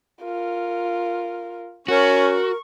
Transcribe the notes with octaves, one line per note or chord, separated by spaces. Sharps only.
F4 A#4
C#4 F#4 A#4 C#6